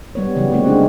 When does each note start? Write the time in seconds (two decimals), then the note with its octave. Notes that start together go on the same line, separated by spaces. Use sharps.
0.15 G3 B3 C#5
0.36 C#3 E3 F#3 B3
0.51 D3 G#3 A#3 C4 F#4 G4
0.66 G#3 C#4 D4